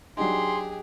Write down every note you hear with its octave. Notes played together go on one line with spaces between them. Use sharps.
F#3 D4 D#4 G4 G#4 C6